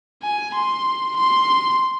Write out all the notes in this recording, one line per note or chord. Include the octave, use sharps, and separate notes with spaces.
G#5
C6
C6